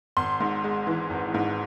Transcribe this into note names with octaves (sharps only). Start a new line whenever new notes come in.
G#1 C6
G#2
G#3
E3
G#1
G#2